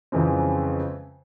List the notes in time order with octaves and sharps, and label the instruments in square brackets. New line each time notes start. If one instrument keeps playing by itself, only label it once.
[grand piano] F2 C#3 E3 G#3 C4